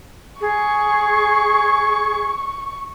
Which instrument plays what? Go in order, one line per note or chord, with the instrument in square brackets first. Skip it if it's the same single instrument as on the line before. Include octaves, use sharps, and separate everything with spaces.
[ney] G#4 [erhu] C#6